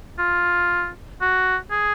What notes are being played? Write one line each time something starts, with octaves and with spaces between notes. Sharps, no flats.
F4
F#4
G#4